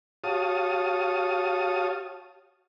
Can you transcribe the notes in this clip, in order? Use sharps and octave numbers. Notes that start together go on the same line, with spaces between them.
F#4 G4 C#5 F5 A5 D#6